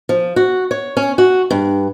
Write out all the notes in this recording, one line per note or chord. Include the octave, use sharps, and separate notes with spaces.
F3
F#4
C#5
C#4
F#4
G2